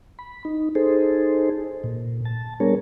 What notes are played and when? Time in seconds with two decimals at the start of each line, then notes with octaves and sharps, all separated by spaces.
0.19 B5
0.45 D#4
0.75 D#4 G#4 A4 C5
1.84 A#2
2.25 A5
2.60 G3 B3 D4 G#4 A#4 C#5